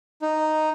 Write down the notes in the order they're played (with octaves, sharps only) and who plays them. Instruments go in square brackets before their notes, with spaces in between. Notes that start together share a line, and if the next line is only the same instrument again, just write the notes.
[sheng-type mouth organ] D#4